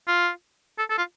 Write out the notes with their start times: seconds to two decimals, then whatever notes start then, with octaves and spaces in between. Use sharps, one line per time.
0.08 F4
0.79 A4
0.90 A4
0.98 F4